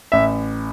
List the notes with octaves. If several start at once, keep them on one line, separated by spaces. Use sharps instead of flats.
A1 E5